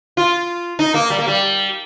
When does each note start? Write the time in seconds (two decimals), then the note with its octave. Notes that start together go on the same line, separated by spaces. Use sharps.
0.17 F4
0.79 D#4
0.94 A#3
1.10 G3
1.19 A#3
1.28 G3